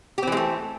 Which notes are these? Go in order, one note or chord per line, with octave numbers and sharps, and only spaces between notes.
E3 G#3 A3 C4 G4